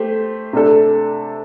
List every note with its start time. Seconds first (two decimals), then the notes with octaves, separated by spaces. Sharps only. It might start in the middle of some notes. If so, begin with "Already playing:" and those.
Already playing: A3 G4 C5
0.53 C3 A3 D4 A4